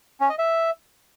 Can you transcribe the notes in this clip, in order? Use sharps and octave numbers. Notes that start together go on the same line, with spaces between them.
C#4
D#5
E5